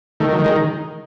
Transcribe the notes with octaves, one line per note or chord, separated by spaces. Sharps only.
D#3 A3
F#3
D#3
G#3